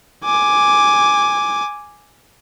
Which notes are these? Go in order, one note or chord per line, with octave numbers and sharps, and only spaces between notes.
G#5 D6